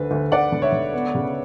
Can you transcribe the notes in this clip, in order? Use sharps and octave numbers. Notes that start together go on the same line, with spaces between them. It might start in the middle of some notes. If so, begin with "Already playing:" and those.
Already playing: D2 D3 B4
D2
D2 D5 F#5
D3
C#5 E5
D3
B3
C#3